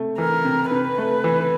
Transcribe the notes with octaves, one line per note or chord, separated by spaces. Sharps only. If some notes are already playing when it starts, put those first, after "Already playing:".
Already playing: C3 A3
E3 A#4
C3
C3 B4
A3
E3